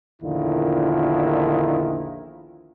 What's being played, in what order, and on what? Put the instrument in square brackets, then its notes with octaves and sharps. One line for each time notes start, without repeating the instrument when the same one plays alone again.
[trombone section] A#1 E2 D3 D#3 E4 F4